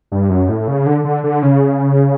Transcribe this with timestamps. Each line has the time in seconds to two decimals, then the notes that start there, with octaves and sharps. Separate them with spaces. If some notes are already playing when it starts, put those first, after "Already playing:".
0.12 G2
0.30 F#2
0.49 A2
0.68 C#3
0.86 D3
1.04 D3
1.24 D3
1.42 C#3